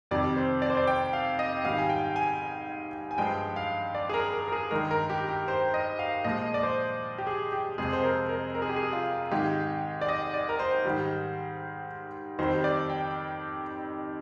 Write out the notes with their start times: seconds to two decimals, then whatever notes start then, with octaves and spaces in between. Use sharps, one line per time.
0.11 F2 C3 D#3 G3 D5
0.37 C5
0.62 D5
0.70 C5
0.77 D5
0.87 G5
1.13 F5
1.39 D#5
1.64 G#2 D#3 G3 F5
1.78 G#5
1.90 G5
2.16 G#5
3.11 G#5
3.18 G2 F3 G#3 G5
3.56 F5
3.95 D5
4.09 G#4
4.14 A#4
4.33 A#4
4.48 A#4
4.52 G#4
4.71 G2 D#3 G#3 A#4
4.91 A#4
5.10 G4
5.29 G4
5.48 C5
5.74 D#5
5.99 F5
6.24 A#2 F3 G#3 D#5
6.54 D5
6.63 C5
7.18 G4
7.27 G#4
7.52 G4
7.78 F2 C3 F3 G#3 G#4
7.93 C5
8.04 A#4
8.29 A#4
8.55 A#4
8.62 G#4
8.69 G4
8.76 G#4
8.93 F4
9.32 G#2 D#3 G#3 G4
10.01 D5
10.09 D#5
10.34 D5
10.49 A#4
10.59 C5
10.85 G#2 D#3 G3
12.39 F2 D#3 G3 C5
12.64 D5
12.90 G5